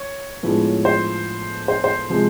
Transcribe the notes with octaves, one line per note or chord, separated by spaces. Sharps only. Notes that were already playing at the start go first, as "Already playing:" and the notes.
Already playing: C#5
A2 F3 G#3 B3 D4
C5
C5
C5
C3 F3 G#3